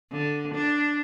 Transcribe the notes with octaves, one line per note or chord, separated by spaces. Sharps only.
D3
D4